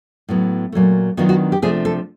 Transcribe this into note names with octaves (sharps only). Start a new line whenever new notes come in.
A2 F#3 B3
A#2 F#3 A3
D#3 F#3 B3 D4 F4 F#4
F#4
G4
C3 F3 A3 D4 G#4
A4